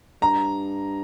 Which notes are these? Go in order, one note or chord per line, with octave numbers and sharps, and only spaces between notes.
G2 A#5